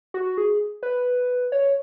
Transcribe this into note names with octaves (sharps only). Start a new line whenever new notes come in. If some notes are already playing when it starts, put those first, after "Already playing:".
F#4
G#4
B4
C#5